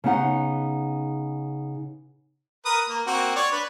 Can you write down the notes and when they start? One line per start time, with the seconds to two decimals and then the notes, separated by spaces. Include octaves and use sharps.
0.04 C#3 B3 D#4 F#5
2.65 A#4 B4 D#6
2.89 A#3
3.07 A#3 C4 F#4
3.36 C#5 D5
3.52 D4 B4